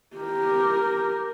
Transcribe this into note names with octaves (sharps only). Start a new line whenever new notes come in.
G4 A#4